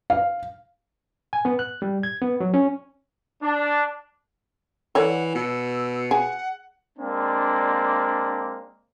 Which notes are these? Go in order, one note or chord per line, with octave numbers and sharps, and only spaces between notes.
F5
G#5
B3
F#6
G3
G#6
B3
F#3
C#4
D4
E3 A4 C#5 D5 F#5
B2 E6
G#4 F#5
G#3 A#3 C4 D4 D5